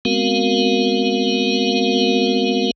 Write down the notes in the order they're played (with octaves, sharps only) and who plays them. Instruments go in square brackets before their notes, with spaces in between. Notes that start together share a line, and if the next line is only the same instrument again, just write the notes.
[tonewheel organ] G#3 B3 C4 F#4 A#4 F5